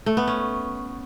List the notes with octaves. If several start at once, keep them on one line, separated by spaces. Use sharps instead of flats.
A3
B3
C#4